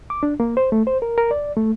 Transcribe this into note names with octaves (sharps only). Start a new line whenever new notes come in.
D6
D4
A#3
C5
A3
C5
A#4
A#4
D5
A3